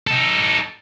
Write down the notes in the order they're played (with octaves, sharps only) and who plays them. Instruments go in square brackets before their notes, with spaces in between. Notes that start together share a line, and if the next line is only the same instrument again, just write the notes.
[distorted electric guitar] D#4 A4